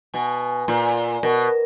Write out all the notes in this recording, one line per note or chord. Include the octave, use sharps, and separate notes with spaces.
B2 G#5
A#2
B2 A#4